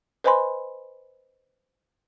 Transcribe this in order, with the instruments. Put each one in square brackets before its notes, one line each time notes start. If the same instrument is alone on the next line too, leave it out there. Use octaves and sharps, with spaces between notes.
[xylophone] B4 C5 D#5 G#5 B5 C6